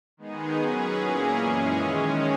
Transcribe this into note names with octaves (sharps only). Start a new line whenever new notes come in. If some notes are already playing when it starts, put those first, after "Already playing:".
D#3 G#3 B3 D#4 G#4
F#3 C#4 G#4 B4
A#2 A#3 C#4 E4 G#4
F#2 E3 G#3 C#4 G#4
D#3 G#3 C#4